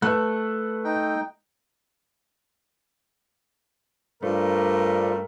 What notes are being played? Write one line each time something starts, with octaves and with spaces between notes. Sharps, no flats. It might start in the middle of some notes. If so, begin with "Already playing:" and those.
A3 B4 F#6
D#4 G5
G2 A3 D4 F4 A#4 C5